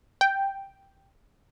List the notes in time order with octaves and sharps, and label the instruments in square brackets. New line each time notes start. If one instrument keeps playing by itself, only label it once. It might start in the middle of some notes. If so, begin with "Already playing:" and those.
[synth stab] G5